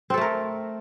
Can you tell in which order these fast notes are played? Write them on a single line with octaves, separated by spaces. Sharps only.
C4 A4 A3 A#4